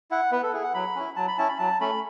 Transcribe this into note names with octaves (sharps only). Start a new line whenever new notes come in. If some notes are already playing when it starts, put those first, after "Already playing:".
E4 F#5
B3 B4
A4
E4 G#4
F#5
F#3 B5
C#4 E4
F#3 A5
B5
C#4 E4 A5
B5
F#3 A5
A3 C#4 B5